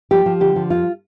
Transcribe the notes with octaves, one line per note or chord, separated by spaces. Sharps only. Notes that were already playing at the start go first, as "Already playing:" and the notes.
F3 G4
F3
D3 G4
F3
F2 F4